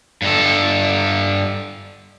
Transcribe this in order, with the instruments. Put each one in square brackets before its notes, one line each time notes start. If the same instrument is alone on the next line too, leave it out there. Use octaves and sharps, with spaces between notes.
[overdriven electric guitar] G2 A4